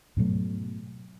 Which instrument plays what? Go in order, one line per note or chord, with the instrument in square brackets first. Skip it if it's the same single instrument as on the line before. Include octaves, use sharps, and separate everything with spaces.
[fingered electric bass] G#2 B2 F#3 A3